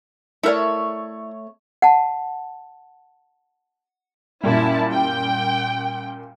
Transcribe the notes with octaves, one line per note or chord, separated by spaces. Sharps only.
A3 E4 A#4 C#5 D5
F#5 A5
F#2 A#2 G3 E4 A5
G5